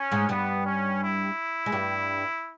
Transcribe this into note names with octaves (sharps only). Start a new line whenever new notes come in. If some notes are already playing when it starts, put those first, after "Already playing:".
Already playing: C#4
G#2 G#3
G2 G3 B3
C#4
E4
G#3
G2 G3